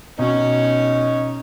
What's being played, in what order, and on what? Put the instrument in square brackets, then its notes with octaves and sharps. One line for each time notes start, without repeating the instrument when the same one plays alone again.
[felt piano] B2 [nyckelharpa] C#4 C#5 [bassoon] D#4